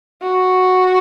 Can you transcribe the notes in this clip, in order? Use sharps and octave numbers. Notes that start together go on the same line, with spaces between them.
F#4